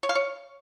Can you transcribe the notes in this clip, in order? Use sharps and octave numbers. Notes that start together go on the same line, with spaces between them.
C#5
F5
C#5